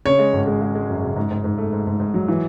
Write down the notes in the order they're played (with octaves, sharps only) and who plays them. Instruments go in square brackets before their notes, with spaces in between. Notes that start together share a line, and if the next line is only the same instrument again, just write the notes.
[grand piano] C#3 [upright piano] C#5
[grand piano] G#3
G#1
G#3
G#3
G#3
F#2
C#3
G#2
G#2
G#2
A3
G#2
G#2
G#2
F#3
E3